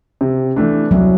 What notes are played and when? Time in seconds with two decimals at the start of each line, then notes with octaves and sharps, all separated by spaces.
0.21 C3
0.56 E3 A3 D4
0.91 C2 F#3